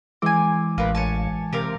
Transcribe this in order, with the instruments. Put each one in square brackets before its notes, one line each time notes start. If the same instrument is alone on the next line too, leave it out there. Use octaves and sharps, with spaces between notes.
[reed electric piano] E3 G#3 D6 [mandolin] C4 G#5
[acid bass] A1 [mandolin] F4 A#4 B4
[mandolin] C#5 G#5 A5
[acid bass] C3 [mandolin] G4 A#4 F5